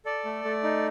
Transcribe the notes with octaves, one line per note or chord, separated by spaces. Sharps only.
A4 D5
A3
A3
D#4